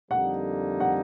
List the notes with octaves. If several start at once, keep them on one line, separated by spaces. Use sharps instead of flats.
F2 D3 G3 A#3 D#4 F#5
F#5